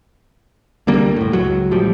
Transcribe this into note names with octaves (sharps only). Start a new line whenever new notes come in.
C2 D3 G3 A#3
F#1 A2
C#2 F#3
A1 F3 G3